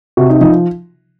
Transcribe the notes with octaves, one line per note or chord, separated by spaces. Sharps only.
C3 F#4
D#4
F3 D#4